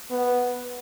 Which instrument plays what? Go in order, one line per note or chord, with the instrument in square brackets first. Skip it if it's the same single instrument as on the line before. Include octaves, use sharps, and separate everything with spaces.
[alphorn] B3